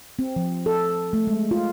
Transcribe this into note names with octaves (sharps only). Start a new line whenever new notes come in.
C4
F3
A4
A3
G#3
F4